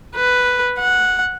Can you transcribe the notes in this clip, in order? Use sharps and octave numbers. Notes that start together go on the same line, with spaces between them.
B4
F#5